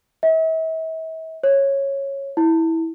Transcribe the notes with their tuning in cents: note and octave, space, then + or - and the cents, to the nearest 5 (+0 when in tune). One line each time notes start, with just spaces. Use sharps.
E5 -40
C#5 -10
E4 -15